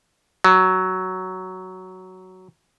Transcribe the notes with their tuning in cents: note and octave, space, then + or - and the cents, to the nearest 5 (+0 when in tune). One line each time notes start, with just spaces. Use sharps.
F#3 +10